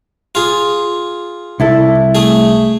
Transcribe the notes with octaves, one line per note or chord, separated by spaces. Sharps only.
F4 G#4
C2 E4 A4
A3 G#4